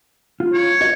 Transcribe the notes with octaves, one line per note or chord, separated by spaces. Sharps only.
F4
C#5
F#4 B4 D#5